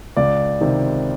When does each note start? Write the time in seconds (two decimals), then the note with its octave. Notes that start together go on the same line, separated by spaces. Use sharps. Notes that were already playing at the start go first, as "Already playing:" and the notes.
0.16 C#2 D5
0.61 C3 D#3